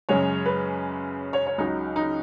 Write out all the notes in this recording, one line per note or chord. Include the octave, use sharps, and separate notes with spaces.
F#2 C#3 G#3 C#5
B4
C#5
C#5
C#2 C#3 F#3 D#4
D#4